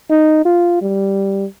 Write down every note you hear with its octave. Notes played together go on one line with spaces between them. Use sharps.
D#4
F4
G3